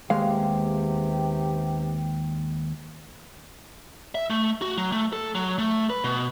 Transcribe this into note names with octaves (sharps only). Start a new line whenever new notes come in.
D#2 C3 G#3 B3 G4 F5
E5
A3
F#4
F#3
A3
A4
F#3
A3
B4
B2